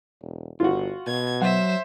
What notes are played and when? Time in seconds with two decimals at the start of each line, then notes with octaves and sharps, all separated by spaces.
0.22 E1
0.60 G1 F4 F#4
1.07 B2 G#6
1.41 F#3 C5 E5 F#5